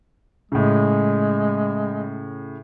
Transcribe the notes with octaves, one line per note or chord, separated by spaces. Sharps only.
A2 C#3 G#3